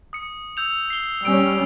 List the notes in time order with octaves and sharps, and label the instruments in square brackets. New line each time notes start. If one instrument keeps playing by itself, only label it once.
[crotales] D#6 C#7
E6 G6 F7
C7 G7
[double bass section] G3 C#4 [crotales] E6 D7